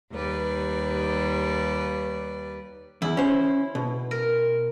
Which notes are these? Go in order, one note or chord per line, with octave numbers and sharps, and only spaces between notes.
D#2 G3 B4 D5
E2 E4
C#4 C5
B2
A#4